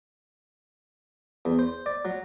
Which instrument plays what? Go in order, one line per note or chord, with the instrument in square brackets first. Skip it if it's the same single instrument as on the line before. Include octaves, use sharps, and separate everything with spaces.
[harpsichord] E2
C5
D5
F#3